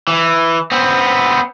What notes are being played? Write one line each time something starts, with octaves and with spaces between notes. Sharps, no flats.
E3
B3 C4